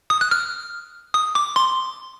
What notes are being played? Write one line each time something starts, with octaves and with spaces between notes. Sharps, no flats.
D#6
F#6
F6
D#6
D6
C6